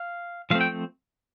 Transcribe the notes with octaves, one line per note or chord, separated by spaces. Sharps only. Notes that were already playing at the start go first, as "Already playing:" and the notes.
Already playing: F5
F3 A3 C4 F5
G5